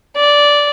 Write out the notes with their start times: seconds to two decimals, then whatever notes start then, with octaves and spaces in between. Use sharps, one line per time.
0.16 D5